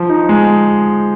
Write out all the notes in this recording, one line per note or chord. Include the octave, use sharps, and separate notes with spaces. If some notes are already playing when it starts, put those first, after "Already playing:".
Already playing: F3
D#4
G#3